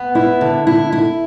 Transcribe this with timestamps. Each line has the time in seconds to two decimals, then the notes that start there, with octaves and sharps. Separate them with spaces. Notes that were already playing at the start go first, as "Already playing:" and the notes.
Already playing: B3
0.15 E4
0.41 D3
0.67 E4
0.92 E4